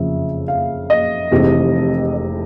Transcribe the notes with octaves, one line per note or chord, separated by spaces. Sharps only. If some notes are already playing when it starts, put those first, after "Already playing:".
Already playing: F#1 F2 C#3 F3 E5
F5
D#5
F1 F2 C3 E3 G#3
D#5